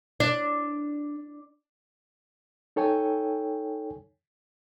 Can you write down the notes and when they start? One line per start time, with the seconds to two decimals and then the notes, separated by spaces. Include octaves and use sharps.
0.20 D4
2.76 D#4 A4 C#5 G5 G#5